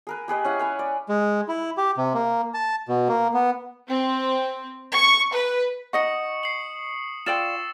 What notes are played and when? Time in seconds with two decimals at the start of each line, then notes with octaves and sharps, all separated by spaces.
0.07 G#4 A#4 B4
0.28 G4 G#4 B4 D#5
0.45 C#4 E4 F#5
0.59 B4 C#5 G#5
0.79 D5
1.09 G#3
1.48 E4
1.78 G4
1.98 C3
2.14 A#3
2.54 A5
2.89 B2
3.08 A#3
3.34 B3
3.87 C4
4.94 C#6
5.33 B4
5.93 D#4 D#5 F#5 C#6 D#6 C#7
6.43 C7 F#7
7.26 F4 D5 G5 E6 A6 E7